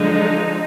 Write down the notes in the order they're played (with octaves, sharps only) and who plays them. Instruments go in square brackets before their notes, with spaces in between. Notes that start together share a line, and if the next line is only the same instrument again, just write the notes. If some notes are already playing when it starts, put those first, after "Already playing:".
Already playing: [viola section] D3 F3 G#3 D#4 [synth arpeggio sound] F#3